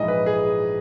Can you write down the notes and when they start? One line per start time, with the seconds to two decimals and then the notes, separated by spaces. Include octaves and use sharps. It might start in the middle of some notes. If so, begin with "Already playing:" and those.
Already playing: A#1 G#2 E3 D#5
0.08 B4
0.26 G#4